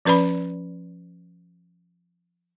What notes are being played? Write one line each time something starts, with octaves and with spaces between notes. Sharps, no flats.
F3 C#4 B4 D5 B5